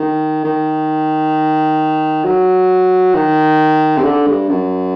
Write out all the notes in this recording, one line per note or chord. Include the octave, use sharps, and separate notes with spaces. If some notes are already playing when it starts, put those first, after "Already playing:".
Already playing: D#3
D#3
F#3
D#3
C3
D3
G2
F#2